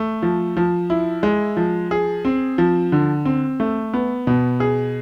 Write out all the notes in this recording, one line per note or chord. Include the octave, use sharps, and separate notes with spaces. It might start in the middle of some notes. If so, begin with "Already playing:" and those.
Already playing: A3
F3
F3
E4
G#3
F3
G#4
C4
F3
D3
C4
A3
B3
B2
G#4